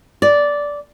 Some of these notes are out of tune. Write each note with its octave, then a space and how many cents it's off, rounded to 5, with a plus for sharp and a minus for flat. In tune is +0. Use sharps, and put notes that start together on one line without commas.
D5 -10